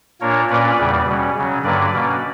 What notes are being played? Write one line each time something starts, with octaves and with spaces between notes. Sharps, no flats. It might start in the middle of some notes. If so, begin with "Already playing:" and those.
A#2 A#3 D4 A#4 C#5
A#2 A#3 C#4 B4 D5
E2 C#3 G3
B2 G3 C#4
C#3 F#3 C#4
G2 D3 F#3 A#3 B4 D5
B2 A#3 C#4